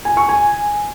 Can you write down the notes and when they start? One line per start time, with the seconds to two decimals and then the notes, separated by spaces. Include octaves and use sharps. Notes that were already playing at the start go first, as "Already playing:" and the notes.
0.05 G#5
0.17 C#6
0.29 G#5